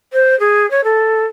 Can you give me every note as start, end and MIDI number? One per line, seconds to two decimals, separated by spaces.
0.13 0.38 72
0.39 0.69 68
0.71 0.84 73
0.84 1.25 69